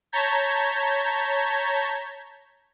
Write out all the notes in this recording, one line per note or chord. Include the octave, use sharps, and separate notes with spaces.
C#5 A5 A#5 G6 G#6 B6